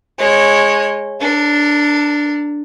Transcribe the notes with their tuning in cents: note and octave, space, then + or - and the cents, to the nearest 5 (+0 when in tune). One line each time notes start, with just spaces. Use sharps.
G#3 +0 C#5 -15
D4 +0 A#4 -40